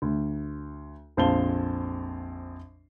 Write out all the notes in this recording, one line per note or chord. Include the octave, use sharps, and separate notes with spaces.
D2
A#1 F2 C5 F5 A5 G7